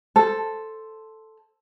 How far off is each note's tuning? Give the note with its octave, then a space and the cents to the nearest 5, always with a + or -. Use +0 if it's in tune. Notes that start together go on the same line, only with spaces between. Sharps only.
A4 +0 C5 +0